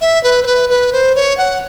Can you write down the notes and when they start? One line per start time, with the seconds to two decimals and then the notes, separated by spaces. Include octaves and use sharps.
0.01 E5
0.24 B4
0.43 C5
0.47 B4
0.70 B4
0.92 C5
1.15 C#5
1.38 F#5